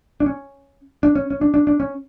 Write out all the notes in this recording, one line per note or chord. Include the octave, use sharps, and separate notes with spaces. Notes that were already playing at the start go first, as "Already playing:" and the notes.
D4
C#4
D4
C#4
C#4
D4
D4
D4
C#4